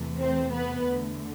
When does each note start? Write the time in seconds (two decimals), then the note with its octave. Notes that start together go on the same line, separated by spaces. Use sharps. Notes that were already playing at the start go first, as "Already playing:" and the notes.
Already playing: E2 C3 E3 A3
0.19 C4 C5
0.53 B3 B4
0.88 E2 D3 A3